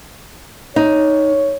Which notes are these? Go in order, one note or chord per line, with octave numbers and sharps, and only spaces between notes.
D#4 C#5